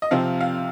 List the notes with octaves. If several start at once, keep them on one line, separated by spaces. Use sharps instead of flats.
D#5
C3 F3 C4 F5
F5